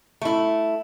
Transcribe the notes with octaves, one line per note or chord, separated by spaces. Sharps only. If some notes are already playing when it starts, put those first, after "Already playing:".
A3 E4